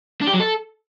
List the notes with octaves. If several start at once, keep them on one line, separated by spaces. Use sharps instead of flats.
D4
G4
F#3
A4